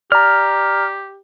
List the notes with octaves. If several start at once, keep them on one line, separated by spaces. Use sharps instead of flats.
G4 D5 A#5 F6